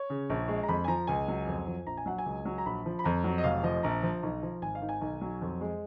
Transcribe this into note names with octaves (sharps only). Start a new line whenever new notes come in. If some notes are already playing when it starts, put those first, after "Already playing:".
Already playing: C#5
C#3
A#1
G#3
A#5
F2 B5
G#5
F3 A#5
C#2 G#5
F#3
F2
F3
A#1 A#5
G#5
F#3 F#5
G#5
C#2
F#3
A#5
A#1 B5
F3
B5
F2 A#5
F#3
D#5
F1 F5
F3 D#5
A#1 A#5
F3
B1
F3
G#1 G#5
F5
D#3
G#5
B1
F#3
F2
G#3